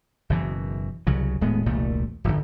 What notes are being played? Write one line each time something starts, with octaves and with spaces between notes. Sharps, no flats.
F#1 B2 E3
C2 C#3 F#3
D#1 A2 G#3 B3
E1 C2 A#2 A3
D1 G1